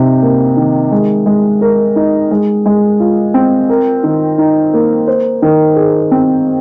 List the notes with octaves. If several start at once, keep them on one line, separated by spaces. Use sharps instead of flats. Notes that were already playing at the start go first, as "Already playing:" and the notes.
Already playing: C3 D#4
A#3
D#3
G#3
G#3
A#4
D#4
G#3
G#3
F4
C4
A#4
D#3
D#4
A#3
C5
D#3
G#4
C4